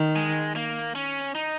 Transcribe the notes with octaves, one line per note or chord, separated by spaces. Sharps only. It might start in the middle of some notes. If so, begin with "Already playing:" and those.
Already playing: D#3
G#3
A#3
C#4
D#4